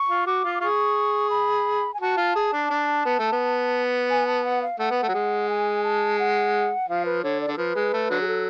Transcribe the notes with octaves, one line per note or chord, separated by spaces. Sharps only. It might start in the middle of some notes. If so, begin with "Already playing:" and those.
Already playing: C#6
F4
F#4 D6
F4
D6
F4 G#4 C#6
B5
G#5
F#4 A5
F4
G#4
D4
D4
B3
A3
B3
G#5
A5
F#5
F5
A3 F#5
B3
A3
F#3
G#3
G#5
A5
F#5
F3 F5
B4
D3 C#5
D5
D3 A4
F3 B4
G#3
A3
D3 F#3
G#4
A4